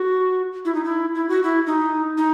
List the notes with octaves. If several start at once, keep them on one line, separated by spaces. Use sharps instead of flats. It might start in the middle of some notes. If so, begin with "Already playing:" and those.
Already playing: F#4
E4
D#4
E4
E4
F#4
E4
D#4
D#4